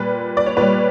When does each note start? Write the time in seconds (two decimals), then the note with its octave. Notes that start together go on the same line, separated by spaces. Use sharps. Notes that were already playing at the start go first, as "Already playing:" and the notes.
Already playing: A#2 G3 B4
0.37 D5
0.46 C#5
0.57 A#2 G3 B4